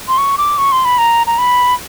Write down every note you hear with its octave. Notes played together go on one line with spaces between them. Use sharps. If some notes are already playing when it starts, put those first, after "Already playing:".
C6
C#6
D6
C#6
C6
B5
A#5
A#5
B5